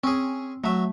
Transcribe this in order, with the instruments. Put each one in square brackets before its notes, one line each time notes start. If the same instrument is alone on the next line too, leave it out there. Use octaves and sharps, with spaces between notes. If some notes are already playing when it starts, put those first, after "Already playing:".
[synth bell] C4 [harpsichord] C#4 G#4
[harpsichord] F#3 E5 [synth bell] A3